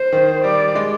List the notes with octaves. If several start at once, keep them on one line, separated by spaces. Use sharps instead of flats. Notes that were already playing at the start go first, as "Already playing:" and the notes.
Already playing: C5
D#3
G3 D5
G#3